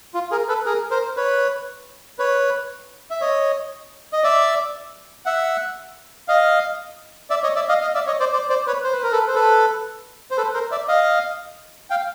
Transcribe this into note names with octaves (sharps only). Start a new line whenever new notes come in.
F4
G#4 A#4
A4 B4
G#4 A#4
A#4 C5
B4 C#5
B4 C#5
E5
C#5 D#5
D#5
D5 E5
E5 F#5
D#5 F5
D5 E5
C#5 D#5
D5 E5
D#5 F5
D#5 F5
D5 E5
C#5 D#5
C5 D5
C5 D5
C5 D5
B4 C#5
C5
B4
A#4
A4 B4
C5
A4 B4
C5
A4 B4
A#4 C5
D5 E5
D#5 F5
F5 G5